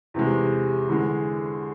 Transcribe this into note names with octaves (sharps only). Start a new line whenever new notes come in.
E2 C3 G#3
E2 D3 G#3